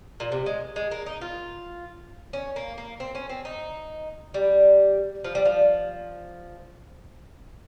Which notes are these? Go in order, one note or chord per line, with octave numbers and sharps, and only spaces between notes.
A#2
C3
G#3
G#3
A#3
D#4
F4
C#4
A#3
A#3
C4
C#4
C4
D#4
G3
F3
G3
F3